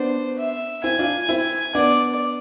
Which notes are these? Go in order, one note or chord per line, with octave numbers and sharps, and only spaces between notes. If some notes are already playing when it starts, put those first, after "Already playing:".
Already playing: B3 D4 C5
E5
C4 E4 G#5
D4 F4
C4 E4
B3 D4 D5